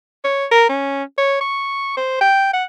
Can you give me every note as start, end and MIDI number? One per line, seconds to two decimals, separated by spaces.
0.24 0.45 73
0.51 0.67 70
0.69 1.03 61
1.18 1.38 73
1.41 1.95 85
1.97 2.17 72
2.21 2.52 79
2.54 2.64 78